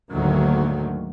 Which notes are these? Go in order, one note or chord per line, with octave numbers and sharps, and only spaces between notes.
D2 G#2 D3 D#3 F#3 A#3